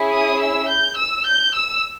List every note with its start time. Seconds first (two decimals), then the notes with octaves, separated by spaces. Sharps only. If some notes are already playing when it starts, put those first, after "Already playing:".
Already playing: C#4 E4 G#4
0.11 D#6
0.40 E6
0.68 G6
0.97 E6
1.26 G6
1.55 E6